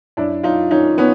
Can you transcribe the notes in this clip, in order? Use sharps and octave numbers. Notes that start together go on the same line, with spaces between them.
F#2 D4 E4
F#2 D#4 F4
D#3 C#4 D#4
D#3 B3 C#4